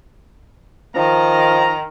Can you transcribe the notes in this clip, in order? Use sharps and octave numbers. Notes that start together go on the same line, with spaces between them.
D#3 F3 A#5